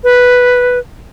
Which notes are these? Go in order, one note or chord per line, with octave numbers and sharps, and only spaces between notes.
B4